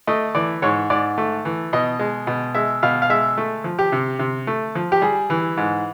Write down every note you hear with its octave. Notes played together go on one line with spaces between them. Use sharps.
A3 D#5
E3 D5
G#2 C#5
G#2 D5
A3
E3
B2 D#5
G#3
B2
G#3 E5
B2 F5
F5
G#3 E5
A3
F3
G4
C3
C3
A3
F3
G4
G3 G#4
E3
G#2